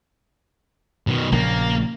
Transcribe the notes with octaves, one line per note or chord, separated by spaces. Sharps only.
B2 D#3
A#1 C#3 A#3